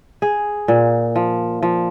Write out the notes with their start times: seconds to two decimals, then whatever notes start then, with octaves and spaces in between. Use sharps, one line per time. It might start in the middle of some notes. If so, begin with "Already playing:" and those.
0.22 G#4
0.68 A#2
1.16 F3
1.62 F3